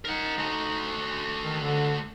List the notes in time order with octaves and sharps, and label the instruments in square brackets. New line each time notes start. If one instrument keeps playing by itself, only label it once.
[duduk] D#4 [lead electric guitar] A#4 F#5
[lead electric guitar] A3 F#4
[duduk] D#3
D3